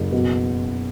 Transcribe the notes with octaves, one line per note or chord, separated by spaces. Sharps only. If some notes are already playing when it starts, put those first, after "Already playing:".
Already playing: F#1
B2